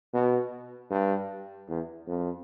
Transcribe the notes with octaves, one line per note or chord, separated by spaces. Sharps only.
B2
G2
E2
F2